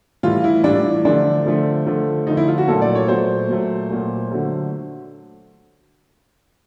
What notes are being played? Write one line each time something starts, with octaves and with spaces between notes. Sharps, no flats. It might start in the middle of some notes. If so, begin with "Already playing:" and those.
A2 E3 G3 F4
E4
A2 E3 G3 D4
D3 F3 A3 D4
D3 F3 A3
D3 F3 A3
D3 F3 A3 D#4
E4
F4
F#4
A#2 F#3 A3 A4
D5
C#5
A#2 F#3 A3 C5
A#2 F#3 A3
A#2 F#3 A3
D3 F#3 A3